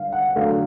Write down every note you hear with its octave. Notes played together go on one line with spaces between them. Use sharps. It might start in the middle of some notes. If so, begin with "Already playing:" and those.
Already playing: D3 G3 F5
F#5
D3 F#3 A3 F5